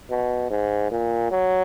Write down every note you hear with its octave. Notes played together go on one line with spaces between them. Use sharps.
B2
G#2
A#2
F#3